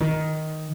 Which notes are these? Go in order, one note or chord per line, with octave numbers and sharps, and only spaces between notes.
D#3